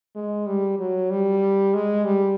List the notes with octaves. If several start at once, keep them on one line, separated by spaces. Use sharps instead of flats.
G#3
G3
F#3
G3
G#3
G3